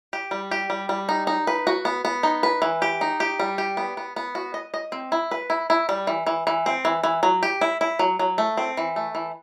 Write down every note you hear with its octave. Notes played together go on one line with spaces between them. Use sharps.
G4
G3
G4
G3
G3
D#4
D#4
B4
F#4
B3
B3
D#4
B4
E3
G4
D#4
G4
G3
G4
B3
B3
B3
F#4
D#5
D#5
C4
E4
B4
E4
E4
G3
E3
E3
E3
C4
E3
E3
F#3
G4
E4
E4
F#3
F#3
A3
C4
E3
A3
E3